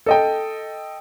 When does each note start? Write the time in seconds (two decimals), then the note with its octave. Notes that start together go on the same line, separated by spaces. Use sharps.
0.06 A4 D#5 G5